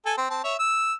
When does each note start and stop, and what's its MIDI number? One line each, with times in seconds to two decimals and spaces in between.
0.06 0.13 69
0.06 0.13 80
0.18 0.27 60
0.30 0.39 60
0.30 0.39 81
0.44 0.54 73
0.44 0.54 76
0.59 0.93 88